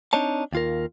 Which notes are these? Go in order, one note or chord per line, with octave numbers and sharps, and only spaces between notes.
C4 D4 D#4 C#5 A5
D#2 F4 A#4